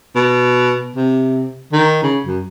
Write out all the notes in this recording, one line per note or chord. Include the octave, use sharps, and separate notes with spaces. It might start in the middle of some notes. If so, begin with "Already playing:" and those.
B2
C3
D#3
C#3
F#2